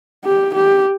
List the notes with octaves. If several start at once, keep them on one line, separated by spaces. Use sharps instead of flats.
G4
G4